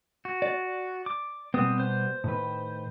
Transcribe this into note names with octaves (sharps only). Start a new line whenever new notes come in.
F#4
D5
D6
B2 G3 B3 C4 D#6
C5
A2 D#3 B4